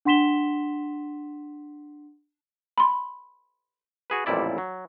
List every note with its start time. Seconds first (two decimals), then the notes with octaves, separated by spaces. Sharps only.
0.05 D4 F#5 C6 B6 E7 G7
2.78 B5 C6
4.10 F#4 G#4 B4
4.26 A1 F2 A#2 G3 E4 D5
4.58 F#3